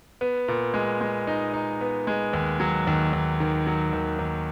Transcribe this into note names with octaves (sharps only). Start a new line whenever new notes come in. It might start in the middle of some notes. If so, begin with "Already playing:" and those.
B3
A#2
G#3
G#3
D#4
D#4
B3
G#3
D#2
F#3
D#2
D#2
D#3
F#3
D#2
D#2